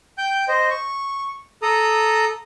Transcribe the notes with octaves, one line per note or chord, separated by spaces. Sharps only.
G5 G6
C5 D#5
C#6
A4 A#5 D#6